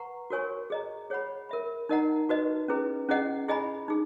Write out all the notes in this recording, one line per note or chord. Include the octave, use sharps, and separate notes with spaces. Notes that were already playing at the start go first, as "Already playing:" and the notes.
Already playing: B4 F#5 A#5 C#6
F#4 A#4 C#5 G#5 C#6
G#4 D#5 A#5
G#4 C#5 F#5 B5
A#4 E5 B5
D#4 A#4 D#5 F#5 A#5
D#4 F#4 B4 D#5
C#4 E4 G#4 B4
C#4 E4 G#4 D#5 F#5
E4 G#4 D#5 G#5 B5
D#4 G#4